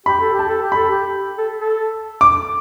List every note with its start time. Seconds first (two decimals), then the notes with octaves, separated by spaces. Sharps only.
0.06 G4 B5
0.20 A4
0.33 G4
0.39 A5
0.48 A4
0.62 G4
0.72 A4 B5
0.90 G4
1.38 A4
1.57 A4
2.21 D6